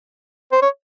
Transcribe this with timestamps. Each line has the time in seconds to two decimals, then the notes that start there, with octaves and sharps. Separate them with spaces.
0.52 C5
0.62 C#5